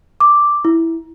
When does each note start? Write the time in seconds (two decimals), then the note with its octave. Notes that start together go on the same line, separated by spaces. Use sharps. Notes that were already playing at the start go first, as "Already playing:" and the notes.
0.20 D6
0.65 E4